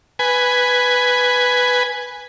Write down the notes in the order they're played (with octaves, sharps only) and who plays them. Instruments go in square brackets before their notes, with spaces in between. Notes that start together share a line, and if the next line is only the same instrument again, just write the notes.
[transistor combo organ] B4 G#5